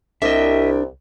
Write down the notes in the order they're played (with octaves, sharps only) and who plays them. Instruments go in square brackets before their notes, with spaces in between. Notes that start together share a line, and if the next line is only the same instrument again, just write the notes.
[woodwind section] C2 [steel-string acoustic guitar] D4 G5 [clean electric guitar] D#5 E5